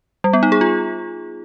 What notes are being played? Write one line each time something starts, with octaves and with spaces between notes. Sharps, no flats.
G3
B3
D#4
G#4
F4